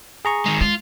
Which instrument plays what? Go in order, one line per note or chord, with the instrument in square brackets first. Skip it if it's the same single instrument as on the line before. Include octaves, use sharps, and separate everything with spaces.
[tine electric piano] G#4 A#5 C#6
[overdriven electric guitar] D#3 G#3
[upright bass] G#3 [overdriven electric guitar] F4